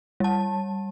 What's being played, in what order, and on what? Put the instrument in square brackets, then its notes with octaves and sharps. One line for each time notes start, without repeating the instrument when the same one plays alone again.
[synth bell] G3 A5